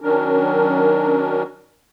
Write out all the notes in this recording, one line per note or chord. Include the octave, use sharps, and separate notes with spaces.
D#3 F#3 C#4 D4 A#4